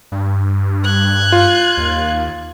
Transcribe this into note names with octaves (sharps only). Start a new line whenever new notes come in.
G2
F#6 G#6
F4
D#2